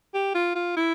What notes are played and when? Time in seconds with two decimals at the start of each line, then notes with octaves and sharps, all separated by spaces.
0.14 G4
0.34 F4
0.55 F4
0.76 E4